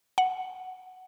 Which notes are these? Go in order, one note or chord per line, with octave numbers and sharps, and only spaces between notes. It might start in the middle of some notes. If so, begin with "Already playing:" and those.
F#5